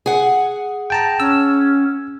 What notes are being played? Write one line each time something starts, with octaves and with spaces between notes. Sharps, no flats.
G#4 F#5
G5 A5 A#5
C#4 E6